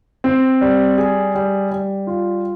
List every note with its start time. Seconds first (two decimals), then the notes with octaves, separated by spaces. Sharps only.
0.24 C4
0.61 G3
0.98 G#4
1.35 G3
1.71 G3
2.07 F4